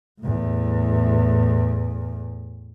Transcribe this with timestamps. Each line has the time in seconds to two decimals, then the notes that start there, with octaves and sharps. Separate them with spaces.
0.20 E2 A2